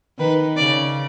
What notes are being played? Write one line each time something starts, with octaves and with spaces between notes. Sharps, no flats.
D#3 B4
C#3 D5